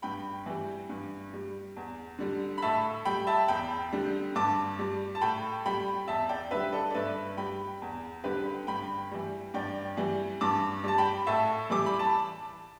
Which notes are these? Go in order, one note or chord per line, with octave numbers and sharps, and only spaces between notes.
G2 G5 B5
E3 G3
G2
G3
E2
D3 G3
B5
A2 E5 A5
G3 G5 B5
E5 A5
E2 G5 B5
D3 G3
G2 A5 D6
G3
A5
A2 G5 B5
G3 G5 B5
E2 E5 A5
D5 G5
D3 G3 B4 E5
A4 D5
D5
G2 B4 E5
G3 G5 B5
E2
D3 G3 G4 B4
G2 G5 B5
E3 G3
G2 D5 G5
E3 G3
G2 A5 D6
G3 A5
G5 B5
A2 E5 A5
E3 G3 D6
B5
A5